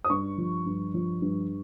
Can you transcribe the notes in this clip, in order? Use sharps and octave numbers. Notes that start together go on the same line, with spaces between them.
D#6
G2 C#6
F3
G2
F3
G2